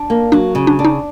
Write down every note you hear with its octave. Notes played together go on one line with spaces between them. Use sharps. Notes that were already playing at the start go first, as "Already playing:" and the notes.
Already playing: D4
A#3
F#3 D4
C#3
D4
D4
D#4